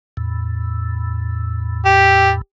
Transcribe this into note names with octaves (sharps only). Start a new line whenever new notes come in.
E2 A2
G4